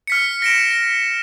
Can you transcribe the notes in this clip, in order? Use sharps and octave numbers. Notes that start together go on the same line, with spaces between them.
F6 B6 C#7
A#6 D7 E7
A#6